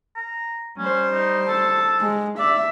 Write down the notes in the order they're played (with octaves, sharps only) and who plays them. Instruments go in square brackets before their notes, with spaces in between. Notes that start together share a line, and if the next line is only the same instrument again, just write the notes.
[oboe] A#5
[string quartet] G3 C5 [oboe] C#4
[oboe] D#4
[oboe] A4 [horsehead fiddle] A5
[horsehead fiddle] G#3
[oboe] D5 [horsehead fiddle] E5